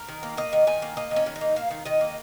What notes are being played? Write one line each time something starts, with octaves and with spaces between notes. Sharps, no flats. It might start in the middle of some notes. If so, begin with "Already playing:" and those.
Already playing: A#4
D#3
A#3
A#3 D#5
D#3
D#3 G#5
A#3
A#3 D#5
D#3
C#4
D#3
D#4
A#3
A#3 F5
D#3
D#3 D#5
A#3